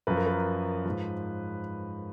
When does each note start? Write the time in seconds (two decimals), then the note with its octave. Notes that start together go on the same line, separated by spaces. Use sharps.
0.07 F#2 F3 B4
0.17 A#4
0.26 B4
0.86 G#2 F3